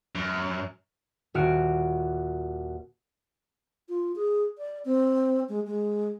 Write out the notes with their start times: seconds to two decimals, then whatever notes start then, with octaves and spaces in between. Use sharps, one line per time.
0.15 F#2
1.34 D#1 F#4 F6 D7
3.89 F4
4.16 G#4
4.58 D5
4.85 C4
5.49 G#3
5.67 G#3